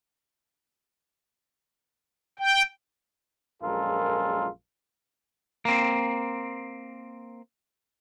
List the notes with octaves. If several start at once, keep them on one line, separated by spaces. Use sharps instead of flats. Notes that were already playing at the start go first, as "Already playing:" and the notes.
G5
A#1 F#2 G#3 F4 A4 A#4
A#3 C4